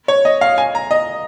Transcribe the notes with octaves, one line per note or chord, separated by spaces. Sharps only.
C#5
D#5
F5
G#5
A#5
D#5